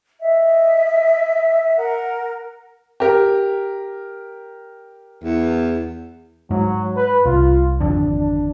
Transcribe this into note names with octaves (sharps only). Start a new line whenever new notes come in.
D#5 E5
A#4 F#5
G4 A#4
E2
G#2 F#3
B4
C2 F4
G#1 F2 D3 D4
D4